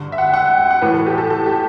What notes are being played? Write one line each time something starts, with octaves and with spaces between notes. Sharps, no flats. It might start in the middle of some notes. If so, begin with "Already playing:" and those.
Already playing: G2 D3
E5
F#5
G5
F#5
G5
G5
F#5
A2 E3 B4
A4
G4
A4
A4
G4